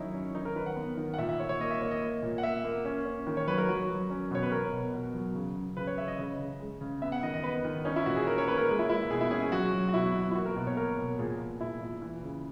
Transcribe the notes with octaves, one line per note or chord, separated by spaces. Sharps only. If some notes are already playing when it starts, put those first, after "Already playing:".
Already playing: D#3 F#3 C#4 D#4 E4 C#5
C#4
D#3 D#4
A#4
D#3 B4
F#5
B3
D#3
F#5
A#2 E5
E5
A#2 C#5
C#5
A#3 D#5
E5
A#3 C#5
D#5
A#3
A#2
F#5
A#3 E5
A#3
C#4
C#4
D#3
C#5
F#3 B4
A#4
F#3 F#4
F#3
C#4
B2 C#5
B4
B2 A#4
B2
B2
F#3
C#3
C#3
C#3 B4
C#5
C#3 E5
D#5
C#3
C#3
G#3
C#3
B3 E5
F#5
D#3 D#5
D#5
B3 B4
D#3
C#4 D#4
E4
A#2 F#4
G#4
C#4 A#4
C#5
A#3 B4
A#4
G#3
E4
G#3 E4
B2 G#4
E4
C#4 G#4
G#4
F#3 F#4
F#3
F#4
B2 E4
B3
E4
A#3 F#4
A#4
B2
C#5
A#3 A#4
B2
A#2 G#4
A#2
A#2 E4
A#2
E3
C#3